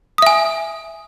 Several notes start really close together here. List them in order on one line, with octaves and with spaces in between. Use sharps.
D#6 E5 G#5